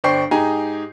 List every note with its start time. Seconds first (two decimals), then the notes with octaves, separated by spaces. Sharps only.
0.04 G1 D4 C5 G5 C#6 C7
0.31 G#2 D#4 G4 G#4 G#5 A#5